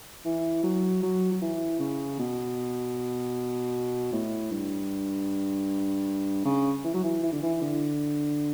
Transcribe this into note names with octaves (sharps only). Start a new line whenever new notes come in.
E3
F#3
F#3
F#3
E3
C#3
B2
A2
G2
C#3
E3
F#3
E3
E3
D3
E3
D3